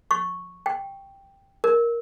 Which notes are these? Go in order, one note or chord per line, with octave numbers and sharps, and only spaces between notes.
C#6
G5
A#4